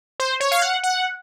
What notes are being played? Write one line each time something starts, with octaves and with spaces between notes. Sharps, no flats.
C5
C#5
F5
F#5
F#5